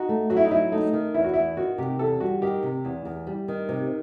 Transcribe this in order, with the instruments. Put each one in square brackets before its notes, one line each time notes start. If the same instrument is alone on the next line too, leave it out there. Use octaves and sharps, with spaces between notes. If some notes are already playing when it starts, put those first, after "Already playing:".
Already playing: [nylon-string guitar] D#4 [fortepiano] F#4
[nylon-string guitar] A3
[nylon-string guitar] F#3 [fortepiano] F#4
[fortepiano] E4
D#4
[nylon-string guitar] F#3 [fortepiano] E4
[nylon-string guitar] A3 [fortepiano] D#4
[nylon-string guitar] D#3
[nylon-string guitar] E2 [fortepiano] E4
[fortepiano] F#4
[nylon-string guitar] E2 [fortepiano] E4
[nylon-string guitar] D#3 [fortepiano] F#4
[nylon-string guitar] C3 [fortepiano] G4
[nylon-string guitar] E2 [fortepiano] A4
[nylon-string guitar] G3 [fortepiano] F#4
[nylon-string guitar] D#3 [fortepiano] G4
[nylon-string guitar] C3
E2
E2
G3
D#3
C3